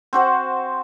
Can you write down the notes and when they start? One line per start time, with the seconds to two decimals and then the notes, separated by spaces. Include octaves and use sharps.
0.13 C4 F#4 C5 F#5